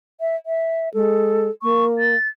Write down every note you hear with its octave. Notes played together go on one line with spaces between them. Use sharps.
E5
E5
G#3 A4
A#3 C#6
A6